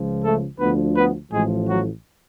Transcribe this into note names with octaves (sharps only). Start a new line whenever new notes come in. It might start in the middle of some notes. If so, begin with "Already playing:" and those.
Already playing: C#2 C#3 F3
A3 A4
D2 D3 F3 B3 B4
B3 B4
A1 A2 F3 G#3 G#4
F#3 F#4